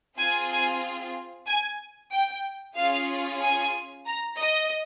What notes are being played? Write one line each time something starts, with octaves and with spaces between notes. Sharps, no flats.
C4 F4 G#4 G#5
G#5
G#5
G5
C#4 F4 G#4 F5
G#5
A#5
D#5